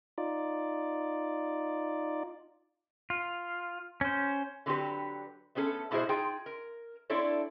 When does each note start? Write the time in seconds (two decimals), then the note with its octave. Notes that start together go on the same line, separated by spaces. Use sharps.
0.18 D#4 F4 D5
3.10 F4
4.01 C#4 C5
4.66 D3 F#3 C4 F#4 G4 B4
5.55 A3 B3 C#4 G#4 A4
5.91 G#2 B2 E4 F#4 G#4 C5
6.09 D#4 F4 G#4 G5
6.46 A#4
7.10 C4 D4 E4 A4 C#5 D5